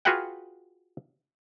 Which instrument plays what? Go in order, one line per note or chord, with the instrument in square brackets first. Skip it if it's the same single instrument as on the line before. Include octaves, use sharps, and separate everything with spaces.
[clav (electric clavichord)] F4 F#4 G#4 B4 F#5 G5